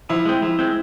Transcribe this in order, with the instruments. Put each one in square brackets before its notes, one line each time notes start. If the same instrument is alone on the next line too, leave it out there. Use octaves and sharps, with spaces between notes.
[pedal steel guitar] F3 [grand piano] E4
[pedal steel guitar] G#3 C4
[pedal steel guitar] F3 [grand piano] E4
[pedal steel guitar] G#3 C4